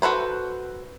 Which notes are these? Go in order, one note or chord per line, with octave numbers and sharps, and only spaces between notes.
F#4 A4 B4 C5